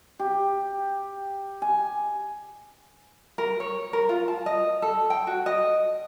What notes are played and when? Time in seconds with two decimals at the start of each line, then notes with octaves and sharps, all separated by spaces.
0.19 G4
1.62 G#5
3.38 A#4
3.60 C#5
3.93 A#4
4.09 F4
4.28 A5
4.46 D#5
4.82 A4
5.10 G5
5.27 F#4
5.46 D#5